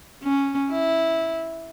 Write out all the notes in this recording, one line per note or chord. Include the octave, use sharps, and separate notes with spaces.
C#4
E4